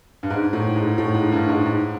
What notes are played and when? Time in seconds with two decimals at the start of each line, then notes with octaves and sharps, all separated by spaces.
0.23 G2
0.30 G#2
0.53 A2
0.76 G#2
0.98 A2
1.14 G#2
1.32 G2
1.49 G#2
1.66 G#2